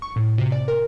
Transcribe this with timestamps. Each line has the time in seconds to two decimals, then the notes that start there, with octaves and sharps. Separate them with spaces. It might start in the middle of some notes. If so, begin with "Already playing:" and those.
0.02 C#6
0.16 A2
0.38 C3
0.52 D5
0.68 A#4